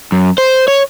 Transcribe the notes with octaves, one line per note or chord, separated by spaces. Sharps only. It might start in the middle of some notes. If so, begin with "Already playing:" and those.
F#2
C5
C#5